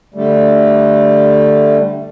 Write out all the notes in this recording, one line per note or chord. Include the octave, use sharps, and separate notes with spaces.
D3 G3 A3